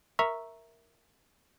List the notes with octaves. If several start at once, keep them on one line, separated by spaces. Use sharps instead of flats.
A#4 E5 A#5 C#6 E6